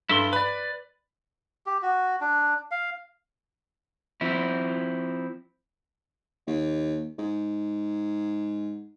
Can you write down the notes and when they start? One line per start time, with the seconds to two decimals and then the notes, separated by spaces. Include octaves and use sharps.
0.09 G2 E4 A4 C6
0.33 B4 D5 B5
1.66 G4
1.82 F#4
2.21 D4
2.71 F5
4.21 F3 C4 E4
6.47 D#2
7.18 G#2